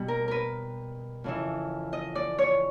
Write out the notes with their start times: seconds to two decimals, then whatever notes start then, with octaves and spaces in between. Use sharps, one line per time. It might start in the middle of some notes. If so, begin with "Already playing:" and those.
Already playing: B2 G3
0.08 A#4
0.28 A#4 B4
1.24 F2 C#3 E3
1.93 D#5
2.15 D5
2.38 C#5